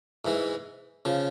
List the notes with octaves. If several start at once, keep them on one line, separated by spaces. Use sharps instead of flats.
G#2 E3 G#3
C#3 F3